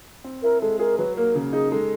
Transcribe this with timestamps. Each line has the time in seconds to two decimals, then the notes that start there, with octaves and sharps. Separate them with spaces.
0.24 C4
0.43 E4 A#4
0.62 G#3 A4
0.79 G#4 A#4
0.98 F#3 B4
1.16 A#3 A#4
1.35 C#3
1.53 D#4 G#4
1.72 G#3 A4